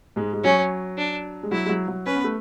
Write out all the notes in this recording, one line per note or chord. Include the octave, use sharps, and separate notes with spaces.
G#2 G#3
G#3
F#3 C#4
D4
G#3
F#3 E4
G#3
F#3
F#3
C#4 B4
B3
A3